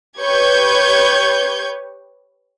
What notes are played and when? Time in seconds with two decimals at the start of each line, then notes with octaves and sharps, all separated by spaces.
0.19 G4 B4 C#5 C#6 G6 G#6